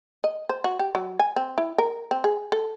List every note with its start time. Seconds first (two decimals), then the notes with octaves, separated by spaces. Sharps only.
0.24 D#5
0.49 C5
0.64 F#4
0.79 G4
0.95 F#3
1.19 G#5
1.36 C4
1.58 E4
1.78 A#4
2.11 C4
2.24 G#4
2.52 A4